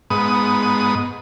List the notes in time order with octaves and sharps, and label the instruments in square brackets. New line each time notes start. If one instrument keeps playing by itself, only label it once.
[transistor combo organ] G#2 B3 D#6